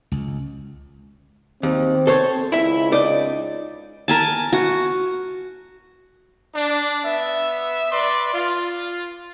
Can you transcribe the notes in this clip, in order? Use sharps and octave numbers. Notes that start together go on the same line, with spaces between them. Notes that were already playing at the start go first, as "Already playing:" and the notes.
C#2
D#2 C4
A4 C5 C#5
C#2 E4 E5
D#4 D5
A#4 G#5 A5
F#4
D4
B3 E5
B4 D5 C6
F4